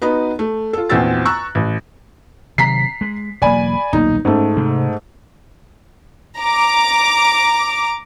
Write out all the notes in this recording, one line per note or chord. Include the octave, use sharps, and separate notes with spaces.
B3 D#4 F#4 B4
A3
F4 A4
A#1 E2 C4 F#4 E6 A6
A#5 C#6 E6 F#6
A1
C3 D#3 F#3 A#5 B6 C7
G#3
E1 F#3 A#3 D5 G#5 B5
D#1 B1 A#3 D#4
G#2 A3 C#4
C3 C4
A#5 D6